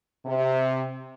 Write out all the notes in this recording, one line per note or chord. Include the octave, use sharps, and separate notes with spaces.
C3